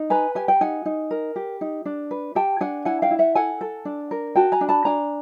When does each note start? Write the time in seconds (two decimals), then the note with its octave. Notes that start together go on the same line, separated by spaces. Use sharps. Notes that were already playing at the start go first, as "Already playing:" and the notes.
Already playing: D#4
0.10 B4 G#5 A#5
0.35 G4 G#5
0.48 G5
0.61 D#4 F#5 G#5
0.86 D#4
1.11 A#4
1.36 G4
1.61 D#4
1.85 D4
2.11 B4
2.35 G4 G5 A5
2.61 D4 F#5 G#5
2.85 E4 F#5 G#5
3.02 F5 G5
3.11 E4
3.19 E5 F#5
3.35 A4 F#5 G#5
3.61 A4
3.85 D4
4.11 A#4
4.35 F#4 G5 A5
4.52 G#5 A#5
4.61 D4
4.69 A5 B5
4.85 D4 G#5 A#5